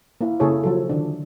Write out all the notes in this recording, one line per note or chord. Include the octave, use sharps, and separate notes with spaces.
A#3 E4
C#3 A#3 E4 G#4 A4 C#5
F3 F#3 A4
D3 D#3 D4